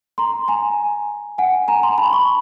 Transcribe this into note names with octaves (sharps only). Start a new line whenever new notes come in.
A#5 C6
G#5 A#5
F#5 G#5
G#5 A#5
A#5 C6
A5 B5
B5 C#6